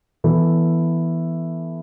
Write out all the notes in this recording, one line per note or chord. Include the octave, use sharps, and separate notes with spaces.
E3 B3 E4 A4